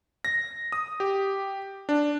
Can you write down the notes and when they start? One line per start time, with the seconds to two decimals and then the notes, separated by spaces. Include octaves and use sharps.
0.25 A#6
0.72 D#6
1.00 G4
1.89 D4